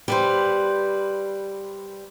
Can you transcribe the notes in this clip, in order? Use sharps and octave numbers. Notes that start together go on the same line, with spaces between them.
G3 B4 C5